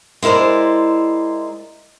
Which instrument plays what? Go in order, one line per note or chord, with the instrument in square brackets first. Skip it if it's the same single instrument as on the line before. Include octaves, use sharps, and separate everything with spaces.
[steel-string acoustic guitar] G#3 E4 A#4 C5 D5